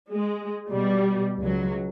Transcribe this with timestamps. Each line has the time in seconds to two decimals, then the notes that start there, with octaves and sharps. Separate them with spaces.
0.12 G#3
0.71 B2 G3
1.38 C#2 F#3